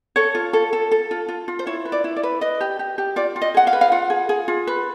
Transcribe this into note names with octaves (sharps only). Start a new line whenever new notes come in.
A4 C#5
F4
A4
A4
A4
F4
F4
F4
C5
E4 C#5
B4
D5
E4
D5
B4
B4 D#5
G4
G4
G4
F4 D5
F4
D#5
G#4 F#5
F5
B4
F5
F4 F#5
G#4
G#4
F4
B4